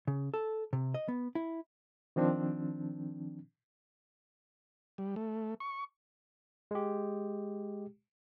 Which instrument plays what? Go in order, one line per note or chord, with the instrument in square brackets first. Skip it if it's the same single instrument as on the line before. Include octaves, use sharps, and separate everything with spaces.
[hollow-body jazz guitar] C#3
A4
C3
D#5
B3
E4
[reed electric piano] D#3 F3 C4 D4
[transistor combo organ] G3
A3
C#6
[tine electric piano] G#3 G4